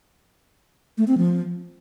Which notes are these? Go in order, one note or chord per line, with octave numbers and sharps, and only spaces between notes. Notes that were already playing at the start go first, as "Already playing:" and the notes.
A3
C4
F3